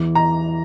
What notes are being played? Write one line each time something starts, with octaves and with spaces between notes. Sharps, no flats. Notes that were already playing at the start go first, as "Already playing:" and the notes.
Already playing: E2 E3
A#5